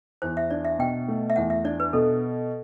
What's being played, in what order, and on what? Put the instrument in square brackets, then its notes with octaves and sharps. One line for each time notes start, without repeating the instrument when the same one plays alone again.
[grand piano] E2 [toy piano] C5
[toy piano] E5
[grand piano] D4 [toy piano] D5
[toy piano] E5
[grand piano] B2 [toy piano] G5
[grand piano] A3
[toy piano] E5
[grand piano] E2 [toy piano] F#5
[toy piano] E5
[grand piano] D4 [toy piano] D5
[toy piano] B4
[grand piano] B2 [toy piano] A4